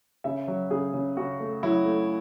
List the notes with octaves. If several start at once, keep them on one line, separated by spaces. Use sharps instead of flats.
C#3 E5
F#3
C#3 G#4
C#3
C#3 F#4
A3
F#3 E4
A3